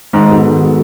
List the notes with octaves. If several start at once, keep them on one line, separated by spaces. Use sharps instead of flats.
G#2 D#3
G#3 B3 F#4 A4
D#3
G#3 B3 F#4 A4